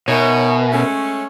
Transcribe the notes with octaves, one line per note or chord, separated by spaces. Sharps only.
B2 D#4 A#4 C#5 E5 G#5
G#3 A3 C#4